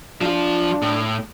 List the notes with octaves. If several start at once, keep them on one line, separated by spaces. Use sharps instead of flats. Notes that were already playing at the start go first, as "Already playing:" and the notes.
F3 D4 F4
A2